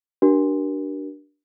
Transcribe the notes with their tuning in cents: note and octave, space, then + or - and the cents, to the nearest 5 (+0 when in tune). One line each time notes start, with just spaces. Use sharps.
D4 +0 G4 -45 A#4 +30